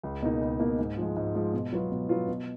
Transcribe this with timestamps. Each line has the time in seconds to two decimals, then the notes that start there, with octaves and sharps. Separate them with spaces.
0.03 C#2
0.22 B2 A#3 D#4
0.41 C#2
0.60 B2 A#3 D#4
0.79 G#2
0.98 F3 G#3
1.17 G#2
1.35 F3 G#3
1.53 B2
1.72 F#3 B3 F4
1.91 B2
2.09 F#3 B3 F4
2.28 B2